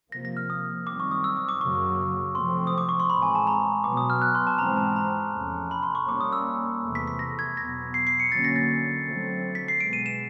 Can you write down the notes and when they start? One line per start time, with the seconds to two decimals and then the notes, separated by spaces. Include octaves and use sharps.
0.12 C3 F3 A#3 A#6
0.25 A#6
0.37 F6
0.50 D#6
0.87 F#2 D#3 G3 C4 D6
1.00 C#6
1.11 D#6
1.24 E6
1.36 D#6
1.49 D6
1.61 F#2 C#3 F#3 A#3 C#6
2.35 C3 F3 A3 C4 C6
2.67 D#6
2.78 D6
2.89 C#6
3.00 C6
3.10 A2 E3 G#3 C4 B5
3.22 G#5
3.35 A5
3.47 A#5
3.84 B2 F#3 B3 D6
3.97 D#6
4.10 F6
4.22 F#6
4.35 C6
4.47 A5
4.58 G#2 E3 G#3 C4 A#5
4.77 A5
4.96 A#5
5.33 E2 C3 F3 A3 C#4
5.71 B5
5.83 C6
5.95 C#6
6.08 A#2 G3 A#3 C#4 D6
6.21 D#6
6.33 E6
6.83 E2 C3 E3 A3
6.95 B6
7.07 B6
7.19 A#6
7.39 G#6
7.57 E2 B2 F#3 B3 A#6
7.94 C7
8.07 C7
8.20 C#7
8.32 D3 F#3 A#3 C#4 A6
8.44 A#6
8.56 A6
9.06 D3 F#3 A3 C4
9.55 B6
9.68 C7
9.80 B2 G#3 B3 D7
9.93 D#7
10.06 E7